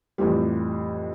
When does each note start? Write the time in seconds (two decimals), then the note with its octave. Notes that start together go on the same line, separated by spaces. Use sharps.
0.18 F2 A2 E3 G3